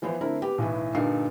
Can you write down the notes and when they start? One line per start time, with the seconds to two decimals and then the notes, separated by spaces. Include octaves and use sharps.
0.02 E3 F3 B3 E4 C5
0.21 D3 A3 C4 E4 A#4
0.42 B3 G4
0.58 B1 A2 E3 B4
0.94 G2 A#2 D3 D#4 A4 C7